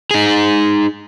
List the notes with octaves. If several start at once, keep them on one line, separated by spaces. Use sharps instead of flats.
D#4 G#4